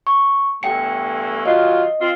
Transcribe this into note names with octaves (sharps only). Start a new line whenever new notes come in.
C#6
E2 G2 A3 G5 C#7
D#3 F#3 F4 D#5
C4 F4